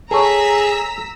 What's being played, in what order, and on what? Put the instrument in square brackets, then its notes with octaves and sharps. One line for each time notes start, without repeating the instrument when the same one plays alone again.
[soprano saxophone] G#4 [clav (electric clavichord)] A4 C#5 [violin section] A#5 E6 B6